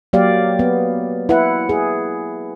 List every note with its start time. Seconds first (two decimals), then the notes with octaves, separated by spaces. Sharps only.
0.13 F#3 A#3 G4 D5 F5
0.59 B3
1.29 E4 B4 F#5
1.69 G#4